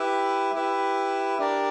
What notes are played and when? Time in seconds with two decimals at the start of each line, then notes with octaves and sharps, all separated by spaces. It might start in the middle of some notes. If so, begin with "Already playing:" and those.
Already playing: E4 G4 B4 E5
0.55 E4 G4 B4 E5
1.39 D4 G4 A#4 D5